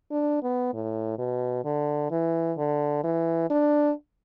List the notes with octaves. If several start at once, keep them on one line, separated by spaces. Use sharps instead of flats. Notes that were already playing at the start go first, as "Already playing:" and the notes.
D4
B3
A2
B2
D3
E3
D3
E3
D4